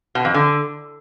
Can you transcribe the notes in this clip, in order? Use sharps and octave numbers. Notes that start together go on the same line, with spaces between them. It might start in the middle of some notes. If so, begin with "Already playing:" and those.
B2
F2
D3